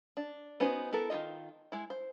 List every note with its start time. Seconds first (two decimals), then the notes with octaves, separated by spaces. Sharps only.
0.17 D4
0.60 B3 C#4 D#4 F#4 C5
0.93 B3 E4 A4 A#4
1.10 D#3 F#3 F4 D#5
1.72 G#3 E4
1.90 C5